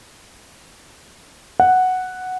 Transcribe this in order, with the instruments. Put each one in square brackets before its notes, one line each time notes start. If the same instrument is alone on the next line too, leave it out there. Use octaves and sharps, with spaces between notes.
[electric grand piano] F#5